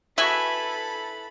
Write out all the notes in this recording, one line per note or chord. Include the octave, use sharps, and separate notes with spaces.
E4 F#4 G#4 A4 B4 E5 G#5 B5